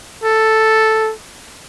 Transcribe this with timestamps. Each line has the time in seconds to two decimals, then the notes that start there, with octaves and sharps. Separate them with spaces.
0.24 A4